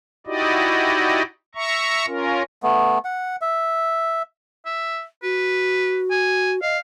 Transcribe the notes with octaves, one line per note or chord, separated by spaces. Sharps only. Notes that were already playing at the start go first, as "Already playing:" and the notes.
D#4 E4 F#4 G4 D5 D#5
E5 A#5 C#6
C#4 F4 A#4
A3 B3
F#5
E5
E5
F#4 B4
G#5
D#5 F5